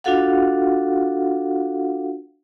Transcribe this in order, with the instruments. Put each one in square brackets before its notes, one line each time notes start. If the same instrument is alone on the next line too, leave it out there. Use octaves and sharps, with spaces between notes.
[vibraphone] D4 F4 F#4 A4 F5 F#5